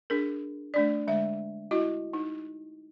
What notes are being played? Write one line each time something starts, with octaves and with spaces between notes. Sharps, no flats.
D4 G#4 A#4
A3 D4 D5
D3 G#3 E5
E4 F#4 D#5
D#4